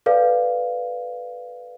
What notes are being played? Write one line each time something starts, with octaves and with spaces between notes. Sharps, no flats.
A4 B4 D5 F5